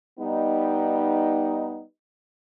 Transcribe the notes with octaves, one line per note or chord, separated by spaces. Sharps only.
G3 B3 D#4